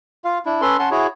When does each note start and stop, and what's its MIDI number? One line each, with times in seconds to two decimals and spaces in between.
0.24 0.38 65
0.24 0.38 77
0.46 0.61 62
0.46 0.61 64
0.61 0.77 61
0.61 0.77 69
0.61 0.77 71
0.61 0.77 84
0.79 0.89 61
0.79 0.89 78
0.79 0.89 81
0.79 0.89 84
0.91 1.07 64
0.91 1.07 66
0.91 1.07 68
0.91 1.07 73